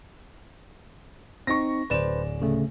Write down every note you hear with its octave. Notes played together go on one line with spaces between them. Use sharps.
C4 D#4 C#6 A#6
D1 B4 C5 D5 E7
C#3 A3